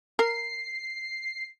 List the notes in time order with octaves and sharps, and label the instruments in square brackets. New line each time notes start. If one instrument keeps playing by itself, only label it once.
[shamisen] A#4 [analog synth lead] C7